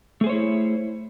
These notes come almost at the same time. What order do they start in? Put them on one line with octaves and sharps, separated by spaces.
A3 G#4 C5 C#5 E4